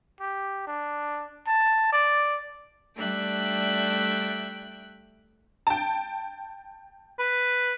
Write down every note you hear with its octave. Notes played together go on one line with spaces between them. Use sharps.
G4
D4
A5
D5
G3 A3 D4 E5 G5 F#6
G5 A5
B4